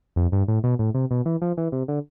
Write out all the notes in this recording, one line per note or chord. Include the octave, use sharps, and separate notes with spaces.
F2
G2
A2
B2
A2
C3
B2
E3
F3
E3
C3
D3